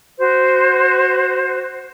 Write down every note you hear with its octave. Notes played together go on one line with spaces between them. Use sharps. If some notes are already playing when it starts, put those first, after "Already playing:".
F#4 C5